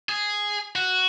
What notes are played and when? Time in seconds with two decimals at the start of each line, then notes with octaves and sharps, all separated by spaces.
0.09 G#4
0.76 F#4